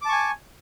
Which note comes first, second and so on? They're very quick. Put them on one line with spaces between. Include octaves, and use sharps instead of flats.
D6 A5 C#6 G#5